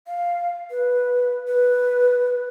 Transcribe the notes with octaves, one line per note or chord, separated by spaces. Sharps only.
F5
B4
B4